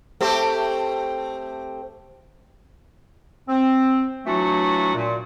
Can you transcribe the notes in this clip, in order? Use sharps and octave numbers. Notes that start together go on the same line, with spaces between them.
A3 C4 G4
C4
E3 F#3 A3 D4 F4 F#4
A#2